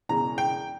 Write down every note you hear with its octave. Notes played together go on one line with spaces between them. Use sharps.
E1 E2 C#3 E3 A#5
G5